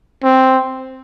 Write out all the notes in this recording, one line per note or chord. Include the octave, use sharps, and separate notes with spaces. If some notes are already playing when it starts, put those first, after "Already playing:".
C4